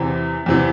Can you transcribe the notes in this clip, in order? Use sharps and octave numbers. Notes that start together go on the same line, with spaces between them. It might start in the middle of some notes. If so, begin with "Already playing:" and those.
Already playing: E2 C3 E3
E2 C3 E3